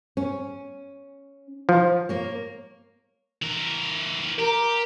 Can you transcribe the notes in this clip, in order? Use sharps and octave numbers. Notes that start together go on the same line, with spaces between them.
C#4
F3
A#3 C#5
E3 A#4
G4 A#4